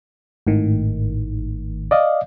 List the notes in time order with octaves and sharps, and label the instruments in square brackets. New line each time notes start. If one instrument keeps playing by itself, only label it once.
[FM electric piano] G#1 A2 D#3
[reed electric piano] D5 D#5 F5